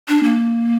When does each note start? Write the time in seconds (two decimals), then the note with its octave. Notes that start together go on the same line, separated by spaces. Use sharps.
0.08 D4
0.23 A#3